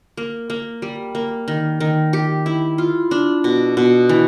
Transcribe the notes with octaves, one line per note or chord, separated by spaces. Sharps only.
A#3
A#3
G3
A#3
D#3
D#3
G4
E4
F4
D4
B2
B2
E3